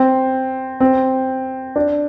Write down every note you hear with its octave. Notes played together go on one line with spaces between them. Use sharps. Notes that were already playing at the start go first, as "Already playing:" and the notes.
Already playing: C4
C4
D4